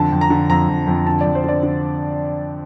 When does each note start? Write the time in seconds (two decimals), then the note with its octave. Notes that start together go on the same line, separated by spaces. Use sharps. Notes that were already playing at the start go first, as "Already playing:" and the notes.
Already playing: F2 D3 A5
0.11 F2
0.21 A#5
0.30 D3
0.49 F2 A#5
0.68 F2
0.87 F2
1.07 D3 A5
1.21 F2 D5
1.35 C5
1.44 D3 D5
1.63 D3